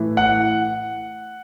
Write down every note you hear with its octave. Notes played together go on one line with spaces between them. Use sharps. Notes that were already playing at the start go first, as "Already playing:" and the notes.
Already playing: A2 E3
F#5